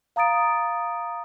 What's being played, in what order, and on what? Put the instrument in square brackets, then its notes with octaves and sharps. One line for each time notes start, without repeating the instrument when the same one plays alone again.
[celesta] F5 A#5 D#6 A6 D7